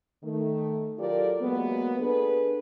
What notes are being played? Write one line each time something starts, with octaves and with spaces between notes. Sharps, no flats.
D#3 A3
F#3 F4 G4 A4 A#4 D5
F#3 G#3 A#3 B3
D4 G#4 A4 B4